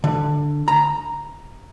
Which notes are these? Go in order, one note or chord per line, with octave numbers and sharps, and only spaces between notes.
D3
A#5